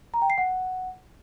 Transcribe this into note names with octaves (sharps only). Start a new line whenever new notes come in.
A#5
G5
C7
F#5